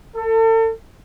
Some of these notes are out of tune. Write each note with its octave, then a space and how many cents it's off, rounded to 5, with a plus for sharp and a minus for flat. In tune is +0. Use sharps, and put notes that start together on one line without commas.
A4 +35